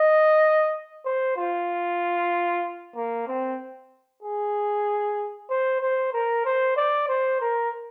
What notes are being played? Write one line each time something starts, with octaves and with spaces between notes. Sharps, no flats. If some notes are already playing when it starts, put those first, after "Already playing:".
Already playing: D#5
C5
F4
A#3
C4
G#4
C5
C5
A#4
C5
D5
C5
A#4